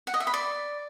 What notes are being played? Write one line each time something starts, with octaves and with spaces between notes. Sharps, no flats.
F#5
D#5
E5
B5
D5